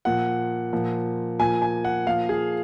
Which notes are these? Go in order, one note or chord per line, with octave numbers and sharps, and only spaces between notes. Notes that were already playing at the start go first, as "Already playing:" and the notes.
A#2 F3 F#5
A#2 F3
A#2 F3 G#5
G#5
F#5
A#2 F3 F5
G#4